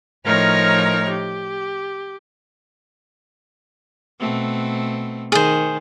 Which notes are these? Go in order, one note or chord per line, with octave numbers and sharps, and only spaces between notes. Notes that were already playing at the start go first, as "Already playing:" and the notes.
A2 F3 D#4 A#4 C#5 F6
G4
B2 A3 C4
D#3 G#4 C5